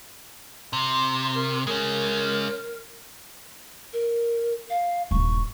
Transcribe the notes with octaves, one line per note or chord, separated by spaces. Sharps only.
C3 C6
A#4
G#3 C#4 A#4
A#4
F5
D#1 G2 C#6